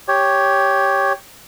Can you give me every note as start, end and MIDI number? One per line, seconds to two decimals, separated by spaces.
0.08 1.13 67
0.08 1.13 73